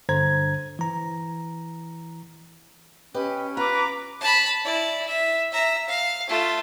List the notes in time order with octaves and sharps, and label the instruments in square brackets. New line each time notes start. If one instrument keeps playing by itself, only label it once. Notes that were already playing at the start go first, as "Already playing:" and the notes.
[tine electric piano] G2 D3 C5 A#5 G#6
E3 A#5
[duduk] C#4 [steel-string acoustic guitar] G4 B4 D#5
[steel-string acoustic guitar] F4 [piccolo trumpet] B4 [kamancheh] A#5 D6
[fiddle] A5 B5
E4 D5
E5
E5 A#5
F5
A3 F4